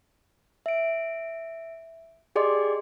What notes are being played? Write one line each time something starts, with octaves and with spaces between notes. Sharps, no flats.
E5 D7
G4 G#4 D5 D#5 C6 D6